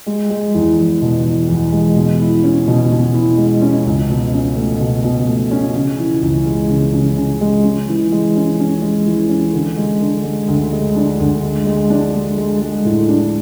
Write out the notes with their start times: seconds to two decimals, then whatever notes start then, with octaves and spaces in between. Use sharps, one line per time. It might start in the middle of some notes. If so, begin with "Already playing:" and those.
0.06 G#3
0.30 G#3
0.54 E2
0.78 E2
1.02 B2
1.25 E2
1.48 E2
1.72 G#3
1.96 B2
2.20 E4
2.44 C#4
2.68 B2
2.91 B2
3.14 E4
3.38 G#3
3.62 C#4
3.86 C#2
4.09 B2
4.33 C#4
4.56 A3
4.80 B2
5.03 B2
5.27 A3
5.51 C#4
5.75 C#3
5.99 E3
6.22 C#2
6.46 G#3
6.69 C#3
6.93 C#3
7.17 C#3
7.41 G#3
7.64 C#4
7.88 E3
8.12 G#3
8.36 C#4
8.59 C#4
8.82 G#3
9.06 E3
9.29 C#4
9.53 D3
9.77 G#3
10.01 D3
10.24 G#3
10.48 D2
10.72 G#3
10.96 D4
11.20 D2
11.43 G#3
11.66 G#3
11.90 D4
12.14 G#3
12.37 G#3
12.61 G#3
12.85 A2
13.08 D4